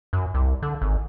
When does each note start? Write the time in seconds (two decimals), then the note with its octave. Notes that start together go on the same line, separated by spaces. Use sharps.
0.13 F#2
0.34 C2
0.62 D3
0.81 G#1